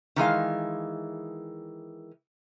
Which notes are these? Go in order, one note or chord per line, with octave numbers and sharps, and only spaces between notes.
D#3 E3 G#3 F5